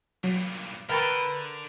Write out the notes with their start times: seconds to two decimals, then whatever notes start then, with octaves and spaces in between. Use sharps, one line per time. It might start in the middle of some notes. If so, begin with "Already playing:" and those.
0.24 G2 A#2 F#3
0.89 D3 A#4 B4 G5 C#6 A6 C#7